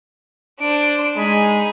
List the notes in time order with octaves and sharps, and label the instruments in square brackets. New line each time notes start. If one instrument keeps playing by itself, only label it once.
[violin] D4 C5 [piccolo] D7
[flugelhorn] G#3 [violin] D#4 G#4 [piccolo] B5